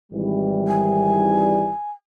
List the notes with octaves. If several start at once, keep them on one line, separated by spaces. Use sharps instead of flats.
G#1 E3 G3
G#5